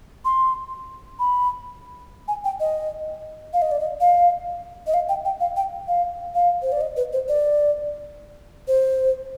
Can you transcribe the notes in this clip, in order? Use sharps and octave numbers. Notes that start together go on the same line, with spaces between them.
C6
B5
G#5
G5
D#5
F5
D#5
D5
D#5
F5
D#5
F5
G5
G5
F5
G5
F5
F5
C5
D5
D#5
B4
C5
D5
C5